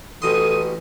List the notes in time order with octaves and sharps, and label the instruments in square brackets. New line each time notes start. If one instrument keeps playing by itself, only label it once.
[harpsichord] A1 B2 C6 [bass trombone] E3 [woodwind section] A4 D#6